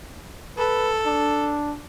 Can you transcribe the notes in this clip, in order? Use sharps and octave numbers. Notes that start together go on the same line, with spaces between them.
A4 B4
D4